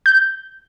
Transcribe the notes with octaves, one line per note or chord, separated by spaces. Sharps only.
G6